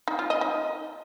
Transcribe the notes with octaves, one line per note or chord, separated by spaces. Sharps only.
D#4
F4
D#5
D#4